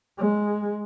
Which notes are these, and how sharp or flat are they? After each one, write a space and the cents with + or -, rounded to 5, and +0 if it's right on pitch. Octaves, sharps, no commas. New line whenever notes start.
G#3 +5